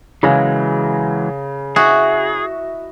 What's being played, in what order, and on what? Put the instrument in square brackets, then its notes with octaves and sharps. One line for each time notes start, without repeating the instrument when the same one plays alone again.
[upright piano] C#3 [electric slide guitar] E3 F#3 G#3 [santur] A#4
[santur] E4 D#5 E5 [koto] F#4 [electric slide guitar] G#4